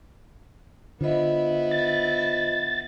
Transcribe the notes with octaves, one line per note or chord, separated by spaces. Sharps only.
D3 B3 E4 F4 C5 D#5
A6